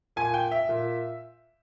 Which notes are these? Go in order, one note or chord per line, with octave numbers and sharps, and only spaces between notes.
A#2 G#5
G5
E5
A#2